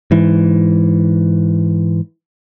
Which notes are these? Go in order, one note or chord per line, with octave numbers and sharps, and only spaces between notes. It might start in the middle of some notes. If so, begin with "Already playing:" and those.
G#2 E3